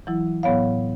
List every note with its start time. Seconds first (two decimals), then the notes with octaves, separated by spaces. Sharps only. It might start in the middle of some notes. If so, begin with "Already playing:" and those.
0.07 E3 F#3 E4
0.43 A2 F#3 B3 C#5 F5